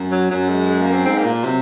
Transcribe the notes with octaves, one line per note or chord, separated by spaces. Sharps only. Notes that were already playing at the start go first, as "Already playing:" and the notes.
Already playing: F#2
F#3
F#2 F#3
G#3
G#3
A#3
C4
G#2 C4
A#3
A#2
C3 F#3